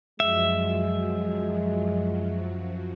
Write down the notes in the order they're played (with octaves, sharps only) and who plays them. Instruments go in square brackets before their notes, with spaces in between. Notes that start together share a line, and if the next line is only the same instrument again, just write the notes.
[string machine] F#2 F3 F#3 [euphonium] G#3 [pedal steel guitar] E5